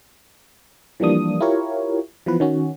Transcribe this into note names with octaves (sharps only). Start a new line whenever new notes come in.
E3 F3 G3 A#3 D4 D#6
E4 F4 G4 A#4 C#5
E3 F3 B3 B4
D#3 C#4 F#4